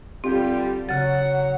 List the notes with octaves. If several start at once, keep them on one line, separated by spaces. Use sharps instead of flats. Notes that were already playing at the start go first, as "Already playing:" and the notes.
D3 G3 C4 F4 G4
C#3 F#3 F#5 A6